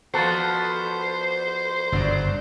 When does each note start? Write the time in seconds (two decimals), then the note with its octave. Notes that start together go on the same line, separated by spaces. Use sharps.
0.14 F3 B3 F#4 A4 C5
1.92 G1 F#2 C#3 F#3 D4